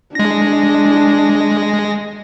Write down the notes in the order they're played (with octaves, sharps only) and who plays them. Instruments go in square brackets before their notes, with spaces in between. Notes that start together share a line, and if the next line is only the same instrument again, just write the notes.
[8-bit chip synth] G#3 A#6 [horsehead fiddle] D4